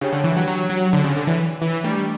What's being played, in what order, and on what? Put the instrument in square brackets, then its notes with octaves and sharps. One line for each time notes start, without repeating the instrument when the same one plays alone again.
[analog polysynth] C#3 [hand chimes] D4 G4 C#5 G5
[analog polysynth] D3
E3
F#3
F#3
F#3
D3
C#3
D3
E3
E3
[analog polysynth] G3 [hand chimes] A3 D4 G4